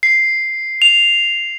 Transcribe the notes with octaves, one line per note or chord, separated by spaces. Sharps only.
C7
F7